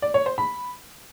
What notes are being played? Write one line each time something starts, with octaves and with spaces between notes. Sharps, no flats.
D5
C#5
C5
B5